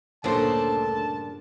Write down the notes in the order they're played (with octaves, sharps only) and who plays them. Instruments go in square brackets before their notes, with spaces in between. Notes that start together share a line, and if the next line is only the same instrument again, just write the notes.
[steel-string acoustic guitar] D2 A4 [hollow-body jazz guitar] G2 A#2 C#3 [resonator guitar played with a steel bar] D4 C5 [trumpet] A5